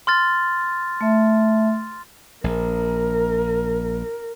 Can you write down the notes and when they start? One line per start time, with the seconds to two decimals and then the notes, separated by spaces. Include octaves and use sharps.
0.07 C6 F6 A6
1.01 A3 E5
2.44 A#1 A#4